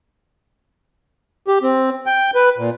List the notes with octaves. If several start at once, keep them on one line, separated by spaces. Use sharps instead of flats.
G4
C4
G5
B4
A#2